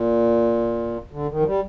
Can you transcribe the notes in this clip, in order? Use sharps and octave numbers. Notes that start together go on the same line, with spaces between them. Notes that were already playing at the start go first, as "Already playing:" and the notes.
Already playing: A#2
D3
D#3
F3
G3